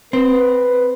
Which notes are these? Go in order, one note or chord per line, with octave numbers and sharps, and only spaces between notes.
C4 B4